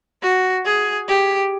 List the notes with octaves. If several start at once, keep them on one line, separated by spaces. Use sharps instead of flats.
F#4
G#4
G4